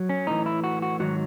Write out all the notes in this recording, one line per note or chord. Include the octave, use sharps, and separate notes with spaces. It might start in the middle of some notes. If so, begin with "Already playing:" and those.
Already playing: F#3
C#4
A2 E3 D#4
E4
F#4
F#4
G#2 D#3 F#3 F#4